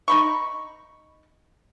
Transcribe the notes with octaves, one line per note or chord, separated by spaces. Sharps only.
D#4 B5 C#6